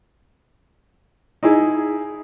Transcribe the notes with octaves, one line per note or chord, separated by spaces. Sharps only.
D#4 E4 G#4